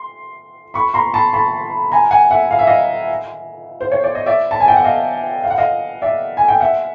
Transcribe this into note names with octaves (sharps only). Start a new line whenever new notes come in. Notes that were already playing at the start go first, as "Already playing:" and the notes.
Already playing: C6
B5 C#6
A#5 C6
A5 B5
A5 B5
G#5 A#5
F#5 G#5
E5 F#5
F5
E5
D#5 F5
C5
C#5
D5
D#5
D5 E5
A5
G#5
G5
F#5
D#5 F5
F5
F#5
D#5 F5
D5 E5
G#5
G5
E5 F#5